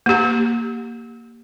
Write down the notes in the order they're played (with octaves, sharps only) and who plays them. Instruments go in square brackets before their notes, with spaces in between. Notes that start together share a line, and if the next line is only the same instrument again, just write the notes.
[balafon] A#3 G4